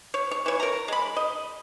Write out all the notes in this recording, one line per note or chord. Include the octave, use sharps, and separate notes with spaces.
C#5
C#5
E3 C#5
A#4 A#5
G#3 B5
D#5